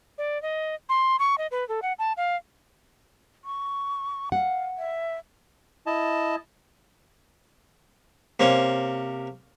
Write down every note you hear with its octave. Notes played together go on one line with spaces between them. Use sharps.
D5
D#5
C6
C#6
D#5
B4
A4
F#5
A5
F5
C#6
F5 F#5
E5
E4 D#5 A5
C3 A#3 C#4